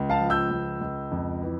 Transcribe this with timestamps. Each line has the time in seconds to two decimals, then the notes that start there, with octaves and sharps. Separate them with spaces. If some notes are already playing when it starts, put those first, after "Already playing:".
Already playing: C#2
0.10 F5 A5
0.20 F3
0.30 E6 G6
0.50 C#2
0.81 C#2
1.11 F2
1.42 E3